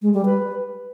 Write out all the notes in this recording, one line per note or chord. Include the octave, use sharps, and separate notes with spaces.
G#3
G3
B4